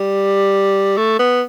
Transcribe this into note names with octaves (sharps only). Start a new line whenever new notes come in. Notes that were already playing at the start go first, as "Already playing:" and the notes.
Already playing: G3
A3
B3